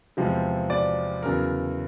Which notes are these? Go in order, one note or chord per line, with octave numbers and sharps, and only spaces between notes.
E2 C3 F3 G#3
D5
E2 C#3 F#3 A#4